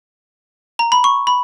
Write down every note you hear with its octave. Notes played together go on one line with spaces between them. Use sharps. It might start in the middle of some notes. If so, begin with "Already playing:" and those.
A#5
B5
C#6
B5